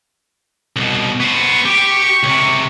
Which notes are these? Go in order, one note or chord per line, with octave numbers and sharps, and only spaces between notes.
C2 B2
B3 C5 C#6
G4 G5
C#2 C3